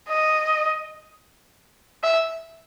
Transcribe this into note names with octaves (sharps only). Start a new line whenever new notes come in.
D#5
E5